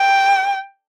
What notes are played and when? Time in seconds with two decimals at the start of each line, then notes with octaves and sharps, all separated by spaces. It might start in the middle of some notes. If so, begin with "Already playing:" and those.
Already playing: G5